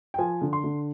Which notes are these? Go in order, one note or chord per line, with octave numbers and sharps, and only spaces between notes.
G5
F3 G#5
D3
C6
D3